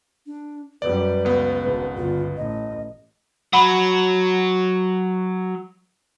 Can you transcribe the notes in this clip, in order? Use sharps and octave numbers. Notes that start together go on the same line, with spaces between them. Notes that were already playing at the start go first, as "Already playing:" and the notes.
D4
F#2 G3 B4 D5
C#2 B3
G#1
G1 F4
A1 D#5
F#3 F#5 B5